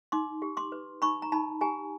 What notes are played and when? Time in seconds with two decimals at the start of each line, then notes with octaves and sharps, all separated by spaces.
0.12 D#4 C6 D6
0.42 G4
0.57 C6 D6
0.72 B4
1.02 D#4 B5 C#6
1.22 A#5
1.32 D#4 A5 B5
1.61 G4 G#5 A#5